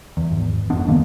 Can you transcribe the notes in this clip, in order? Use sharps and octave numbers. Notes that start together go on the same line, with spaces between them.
E2
G#1
F2 B3 D4
D1 D#3 A#3